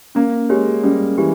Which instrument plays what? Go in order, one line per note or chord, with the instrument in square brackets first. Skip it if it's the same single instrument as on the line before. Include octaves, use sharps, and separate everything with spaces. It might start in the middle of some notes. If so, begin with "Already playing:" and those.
[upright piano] A#3 [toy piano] C#4
[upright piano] G#3 [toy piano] G4 C#5
[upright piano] G3 [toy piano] C#4
[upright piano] E3 [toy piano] G4